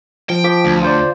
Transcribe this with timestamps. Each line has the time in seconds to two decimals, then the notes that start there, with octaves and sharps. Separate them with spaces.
0.30 F3 G5
0.44 F3 D6 B6
0.65 D2
0.82 F4 C5 D5